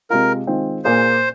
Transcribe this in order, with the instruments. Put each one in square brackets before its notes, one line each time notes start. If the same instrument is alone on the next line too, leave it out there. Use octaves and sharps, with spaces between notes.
[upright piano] C3 G#3 F4 [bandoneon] A#4
[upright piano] D#3 G#3 C4 F4
[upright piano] A#2 A#3 G#4 [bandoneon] C5